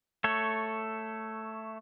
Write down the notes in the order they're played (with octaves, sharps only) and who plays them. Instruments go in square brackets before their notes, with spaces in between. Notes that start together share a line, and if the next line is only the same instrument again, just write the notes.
[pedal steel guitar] A3 A4 C#5